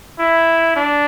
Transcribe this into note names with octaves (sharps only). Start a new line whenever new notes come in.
E4
D4